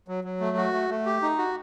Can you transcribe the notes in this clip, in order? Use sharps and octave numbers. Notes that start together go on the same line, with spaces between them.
F#3
F#3
A3
F#4
A3
A3
G4
D#4
F#4